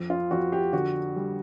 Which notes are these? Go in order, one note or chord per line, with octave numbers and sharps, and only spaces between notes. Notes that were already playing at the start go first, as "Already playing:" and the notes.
Already playing: F2 F3
F4
F2 F#4
G4
D3 F#4
G3